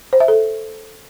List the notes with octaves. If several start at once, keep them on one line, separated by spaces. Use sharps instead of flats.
C5
E5
A4